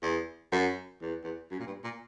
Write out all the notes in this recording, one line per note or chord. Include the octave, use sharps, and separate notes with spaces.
E2
F#2
E2
E2
F#2
A#2
G2
A#2